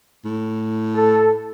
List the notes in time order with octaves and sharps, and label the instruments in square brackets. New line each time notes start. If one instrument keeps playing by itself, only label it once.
[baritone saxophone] A2
[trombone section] A4